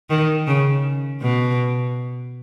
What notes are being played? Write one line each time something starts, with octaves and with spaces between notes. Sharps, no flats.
D#3
C#3
B2